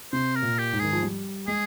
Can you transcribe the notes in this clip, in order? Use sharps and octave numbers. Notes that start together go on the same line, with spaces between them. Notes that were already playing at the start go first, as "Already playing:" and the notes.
C3 C5
A#4
A#2
G4
G#2
D#3 G#4
F3
G3
G#3 G#4